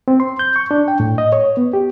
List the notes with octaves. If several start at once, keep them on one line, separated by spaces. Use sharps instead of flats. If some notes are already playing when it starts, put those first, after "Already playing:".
C4
C6
G6
C#6
D4
G5
A2
D#5
C#5
B3
G4